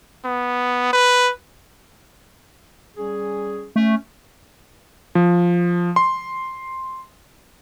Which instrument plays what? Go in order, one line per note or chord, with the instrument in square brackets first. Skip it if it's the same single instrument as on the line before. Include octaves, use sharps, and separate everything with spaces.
[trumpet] B3
B4
[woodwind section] G3 C#4 G#4
[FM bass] A3 [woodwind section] C#4
[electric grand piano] F3
C6